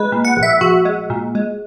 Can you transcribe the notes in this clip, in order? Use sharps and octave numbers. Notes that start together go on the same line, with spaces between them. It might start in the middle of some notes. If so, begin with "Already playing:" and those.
Already playing: G#3 B4
A#2
F#5
A#1
E5
A#1 F#4
G#3
A#2
G#3